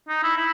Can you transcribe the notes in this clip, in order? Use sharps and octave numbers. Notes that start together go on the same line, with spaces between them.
D#4
E4
E4